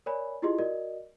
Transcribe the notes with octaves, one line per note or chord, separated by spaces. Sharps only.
A#4 C#5 D5 G#5 B5
E4 F4 G4 G#4 D#5 C6
F#4 A#4 D5 D#5